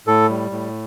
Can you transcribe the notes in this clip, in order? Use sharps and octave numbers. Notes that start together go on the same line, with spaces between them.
A2 A4
G3
A2